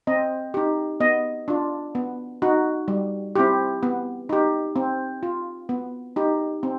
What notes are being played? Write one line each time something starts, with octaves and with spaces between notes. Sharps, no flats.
C4 D#5
D#4 G4
B3 D#5
D4 F4
B3
D#4 F#4
G3
C4 E4 G4
B3
D#4 G4
C4
F4
B3
D#4 G4
C4